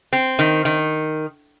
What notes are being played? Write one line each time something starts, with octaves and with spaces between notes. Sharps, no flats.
C4
D#3
D#3